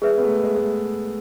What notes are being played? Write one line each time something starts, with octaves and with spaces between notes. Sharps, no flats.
G#3 G#4 B4 E5
B3
A3
G#3
A3